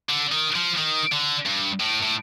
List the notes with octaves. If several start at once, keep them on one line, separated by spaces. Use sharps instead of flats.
D3
D#3
F3
D#3
D3
G2
A2
A2